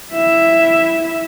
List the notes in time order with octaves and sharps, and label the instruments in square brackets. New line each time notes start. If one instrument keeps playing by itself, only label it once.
[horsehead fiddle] E4 E5